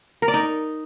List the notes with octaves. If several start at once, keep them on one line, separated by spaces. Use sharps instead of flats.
A#4
D5
D#4